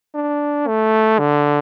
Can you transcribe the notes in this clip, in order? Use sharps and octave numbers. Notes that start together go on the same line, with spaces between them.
D4
A3
D3